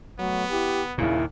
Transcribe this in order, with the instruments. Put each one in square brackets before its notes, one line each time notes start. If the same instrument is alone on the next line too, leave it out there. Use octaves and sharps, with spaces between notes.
[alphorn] F#3 [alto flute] A3 [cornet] B3
[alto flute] E4 [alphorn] G4
[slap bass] D#2 A#2 [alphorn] C#3 [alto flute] E4